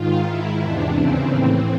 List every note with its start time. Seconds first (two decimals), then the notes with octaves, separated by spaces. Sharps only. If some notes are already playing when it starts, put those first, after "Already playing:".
Already playing: G#2 D#3 F4
0.27 G#2 D#3 E4
0.62 E2 C3 E3 D4
0.96 D#2 C#3 E3 C4
1.31 A2 E3